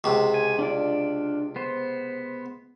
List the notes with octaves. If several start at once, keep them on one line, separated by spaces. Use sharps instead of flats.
C#2 C3
G#5
D4 F4 D5
B3 C5